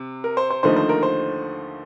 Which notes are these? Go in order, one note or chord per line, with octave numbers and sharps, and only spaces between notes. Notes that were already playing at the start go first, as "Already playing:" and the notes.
Already playing: C3
A#4
C5
C5
D#2 D3 F3 A3 D#4 C5
C5
A#4
C5